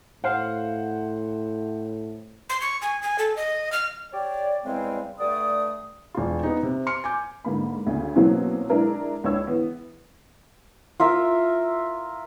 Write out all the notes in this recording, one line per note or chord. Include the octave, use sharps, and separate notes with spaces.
A2 C5 F5 F#5
C6
C#6
G#5
G#5
A4
D#5
F6
G4 C#5 D5
E2 C#3 G3 G#3 C4
G2 D3 A3 D5 D#6
E1 F4
B3 D#4
C3
C6 F6 C#7
G#5 D6 G6
G#2 D3 A#3 B5
D2 C#3
B2 E3 F#3 A#3 C4 C#4
G#3 D4 E4 A#4
C#2 D4 C#5 E6
E3 B3
F4 A#4 E5